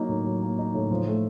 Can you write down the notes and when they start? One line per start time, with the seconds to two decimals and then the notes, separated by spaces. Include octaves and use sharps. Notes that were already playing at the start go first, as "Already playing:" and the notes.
Already playing: F#3 A#3 D#4
0.09 A2
0.25 F#3
0.42 A#3
0.59 D#4
0.74 A2
0.91 F3
1.07 A3